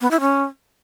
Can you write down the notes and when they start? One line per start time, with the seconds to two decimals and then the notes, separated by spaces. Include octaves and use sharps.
0.01 B3
0.11 E4
0.21 C#4